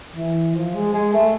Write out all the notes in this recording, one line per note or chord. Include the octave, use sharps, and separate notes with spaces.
E3
F3
G#3
G#3
A3